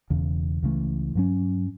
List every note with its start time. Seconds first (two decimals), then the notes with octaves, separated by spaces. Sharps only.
0.10 E1 E2 C#3
0.63 C#2 C#3 E3 A3
1.15 G2 F#3 C#4